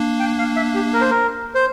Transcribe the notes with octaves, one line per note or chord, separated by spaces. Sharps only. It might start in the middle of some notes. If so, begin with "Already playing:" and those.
Already playing: A#3 D4
G5
F5
E5
G4
A#4
C5
A#4
C5